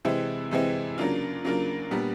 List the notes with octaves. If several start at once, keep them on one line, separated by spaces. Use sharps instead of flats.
C3 E3 G#3 C4 E4
C3 E3 G#3 C4 E4
C#3 F#3 A#3 D4 F4
C#3 F#3 A#3 D4 F4
A#2 G3 B3 D4